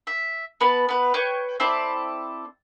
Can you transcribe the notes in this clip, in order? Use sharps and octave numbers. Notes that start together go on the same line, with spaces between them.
E5
B3 B4 A5
B3 B4
B4 C#5 G5 C#6
C4 E4 A4 D5